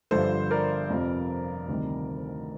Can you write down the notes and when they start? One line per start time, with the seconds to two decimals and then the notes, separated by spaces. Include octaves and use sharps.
0.11 G1 G2 D3 F3 A4 C5
0.51 A#4 D5
0.90 F2 C3 F3
1.68 D2 C3 D#3 G3